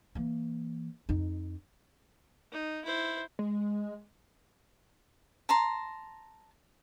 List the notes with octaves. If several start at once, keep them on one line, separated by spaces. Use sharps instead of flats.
E3 A#3
F2 D#4
D#4
E4 C5
G#3
A5 A#5 C6